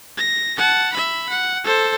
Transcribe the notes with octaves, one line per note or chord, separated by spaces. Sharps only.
A#6
F#5 A5
E5 B5
F#5
A4 C5